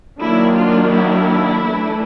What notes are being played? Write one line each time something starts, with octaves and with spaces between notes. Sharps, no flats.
D#3 F#3 A#3 D4 E4
F4
E4
E3 A3 D4